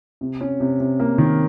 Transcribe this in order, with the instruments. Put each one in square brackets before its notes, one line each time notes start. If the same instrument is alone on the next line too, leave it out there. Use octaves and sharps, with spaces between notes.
[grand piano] C3
C#4
C3
C3
A#3
D#3